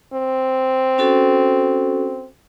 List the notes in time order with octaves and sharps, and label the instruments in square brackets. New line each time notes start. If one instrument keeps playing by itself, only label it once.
[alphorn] C4
[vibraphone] C#4 F#4 A4